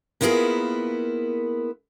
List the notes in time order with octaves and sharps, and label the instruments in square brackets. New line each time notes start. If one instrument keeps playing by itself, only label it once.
[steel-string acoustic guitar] A#3 B3 E4 F4 G#4 A#4